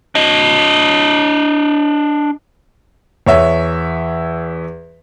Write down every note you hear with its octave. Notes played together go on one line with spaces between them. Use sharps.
D4 D#5
E2 C#5 E5